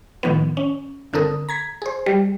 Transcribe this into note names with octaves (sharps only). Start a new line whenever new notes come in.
A2 D#3 F3 B3
C#4
G1 D3 C4 A4 A#4 D#6
A#5 G#6 B6
G#4 C5
G3